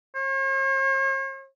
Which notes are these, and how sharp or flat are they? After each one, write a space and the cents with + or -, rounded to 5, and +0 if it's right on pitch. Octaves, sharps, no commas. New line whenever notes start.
C#5 -45